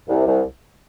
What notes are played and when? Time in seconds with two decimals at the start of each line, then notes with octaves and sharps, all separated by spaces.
0.09 C2
0.27 C2